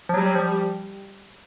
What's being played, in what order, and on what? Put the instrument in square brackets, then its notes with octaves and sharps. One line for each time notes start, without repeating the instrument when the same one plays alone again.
[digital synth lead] F3
[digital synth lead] F#3 [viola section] G3
[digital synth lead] F#3
F3